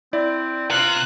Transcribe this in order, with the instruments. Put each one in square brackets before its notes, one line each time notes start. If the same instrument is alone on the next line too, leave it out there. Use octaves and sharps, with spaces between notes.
[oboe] C4 [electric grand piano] E4 D5
[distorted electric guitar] C3 [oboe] F4 [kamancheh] F#6